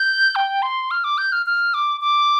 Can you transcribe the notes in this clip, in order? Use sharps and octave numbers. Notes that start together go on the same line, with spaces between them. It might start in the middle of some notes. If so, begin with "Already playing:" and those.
Already playing: G6
G5
C6
F6
D6
G6
F6
F6
D6
D6